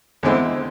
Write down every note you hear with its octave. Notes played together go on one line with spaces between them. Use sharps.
E2 D3 G#3 C4 E4